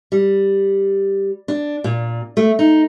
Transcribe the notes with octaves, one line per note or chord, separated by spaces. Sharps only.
G3
D4
A#2
A3
D#4